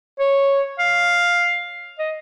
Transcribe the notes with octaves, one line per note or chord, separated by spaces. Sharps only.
C#5
F5
D#5